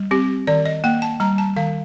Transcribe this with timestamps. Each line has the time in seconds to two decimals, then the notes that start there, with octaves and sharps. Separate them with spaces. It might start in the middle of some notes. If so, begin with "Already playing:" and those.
Already playing: G3
0.11 C4 G4
0.47 D#3 D5
0.66 D#5
0.84 A#3 G5
1.02 A5
1.20 G3 A#5
1.38 A5
1.56 D#3 F5